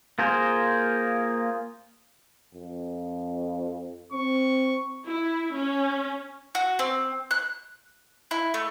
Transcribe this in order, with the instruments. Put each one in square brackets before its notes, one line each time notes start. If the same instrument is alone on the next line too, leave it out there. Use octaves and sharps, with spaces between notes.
[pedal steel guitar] A#3 F4 G#4 A#4 C5
[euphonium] F2
[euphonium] C4 [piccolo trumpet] C#6
[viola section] E4
C#4
[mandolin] F#4
C4
F#6
E4
A3